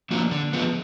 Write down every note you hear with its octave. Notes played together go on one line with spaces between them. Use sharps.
F3 A#3 D4 F#4
D3
F3 G#3 B3